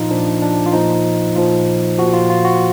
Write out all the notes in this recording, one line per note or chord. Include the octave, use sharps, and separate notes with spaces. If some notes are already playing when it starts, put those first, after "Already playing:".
Already playing: A#2 F3 D#4 F4
A#2 F3 D4
D4
F4
A#2 F3 D#4
A#2 F3 F4
A#2 F3 F#4
F4
F4
F#4